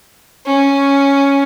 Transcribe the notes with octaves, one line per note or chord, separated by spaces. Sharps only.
C#4